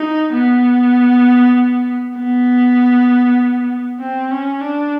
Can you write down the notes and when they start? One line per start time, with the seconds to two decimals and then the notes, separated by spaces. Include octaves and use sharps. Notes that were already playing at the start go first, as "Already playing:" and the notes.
Already playing: D#4
0.33 B3
2.17 B3
4.00 C4
4.31 C#4
4.61 D4